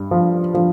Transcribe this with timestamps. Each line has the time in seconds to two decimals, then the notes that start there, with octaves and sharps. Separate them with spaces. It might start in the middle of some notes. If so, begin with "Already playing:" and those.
Already playing: G2
0.11 F3
0.54 F3